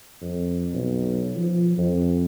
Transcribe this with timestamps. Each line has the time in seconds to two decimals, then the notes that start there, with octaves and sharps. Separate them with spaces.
0.22 F2
0.73 B1
1.36 F3
1.78 F2